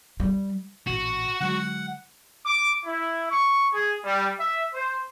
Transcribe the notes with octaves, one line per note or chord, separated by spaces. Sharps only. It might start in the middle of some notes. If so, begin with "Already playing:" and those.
G3
A1 A#2 F#4
D3 F#3 G#3 F#5
D6
E4
C#6
G#4
G3
E5
C5